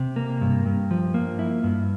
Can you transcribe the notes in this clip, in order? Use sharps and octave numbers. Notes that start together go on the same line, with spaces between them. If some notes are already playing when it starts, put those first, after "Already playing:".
Already playing: C3
A#3
G2
G2
F3
A#3
E4
G2